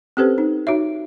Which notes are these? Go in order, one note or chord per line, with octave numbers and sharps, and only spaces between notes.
C4 C#4 G4 A4 B4 C5
D#4
D#4 F#4 C#5 E5